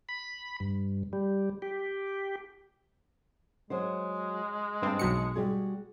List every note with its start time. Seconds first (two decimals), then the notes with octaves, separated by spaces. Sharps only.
0.09 B5
0.60 G2
1.13 G3
1.62 G4
3.70 F#3 G#3 F#4 C5
4.82 G2 C4 G#5 A5
4.99 B1 B2 C#7
5.35 G3 F#4 G#4